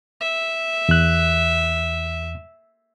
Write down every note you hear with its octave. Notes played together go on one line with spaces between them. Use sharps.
E5
E2 F#6